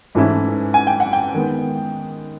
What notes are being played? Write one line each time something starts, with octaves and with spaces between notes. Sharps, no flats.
G#2 E3 A3 C#4 E4
G#5
G5
F#5
G5
D#3 G#3 B3